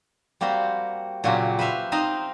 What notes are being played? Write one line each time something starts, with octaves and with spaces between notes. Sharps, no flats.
G3 A#3 C4 F#4 C5
A#2 C#3 F#3 C4 F#4 G4
B4 C5 E5 F5
C4 D#4 C5 D#5 F5